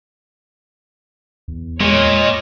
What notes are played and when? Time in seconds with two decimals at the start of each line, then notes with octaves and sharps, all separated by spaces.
1.48 E2
1.81 A#2 G#3 C#5 D#5